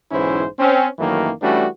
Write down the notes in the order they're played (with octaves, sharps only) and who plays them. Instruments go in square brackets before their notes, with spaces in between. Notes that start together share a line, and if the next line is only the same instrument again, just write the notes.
[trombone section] B1 G#2 E3 C#4 E4 C5
C4 C#4
F#2 D#3 E3 F#3 A3 A#3
E3 G3 A3 C#4 D4 F#4